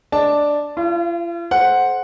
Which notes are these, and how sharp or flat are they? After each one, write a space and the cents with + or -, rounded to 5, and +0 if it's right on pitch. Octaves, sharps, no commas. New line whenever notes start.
D4 +0 D#5 +0 A5 +0
F4 -45 F5 -10
A4 -45 C5 +0 F#5 -5